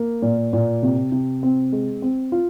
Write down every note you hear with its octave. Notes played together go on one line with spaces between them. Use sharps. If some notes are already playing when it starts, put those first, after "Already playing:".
Already playing: A#3
A#2
A#2
C3
C3
C4
G#3
C4
F4